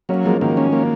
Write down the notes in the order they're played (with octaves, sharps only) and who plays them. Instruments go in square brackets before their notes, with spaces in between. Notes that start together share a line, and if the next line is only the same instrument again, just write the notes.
[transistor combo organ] F#3 [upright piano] A#3 C#4
[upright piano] F3 G#3 [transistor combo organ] A#3
[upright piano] D#3 F#3 [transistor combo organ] A#3
[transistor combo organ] C#4
A#3